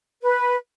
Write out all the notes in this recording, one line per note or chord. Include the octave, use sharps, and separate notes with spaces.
B4